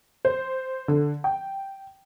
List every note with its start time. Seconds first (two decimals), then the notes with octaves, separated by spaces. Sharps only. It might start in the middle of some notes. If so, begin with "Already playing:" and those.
0.25 C5
0.88 D3
1.24 G5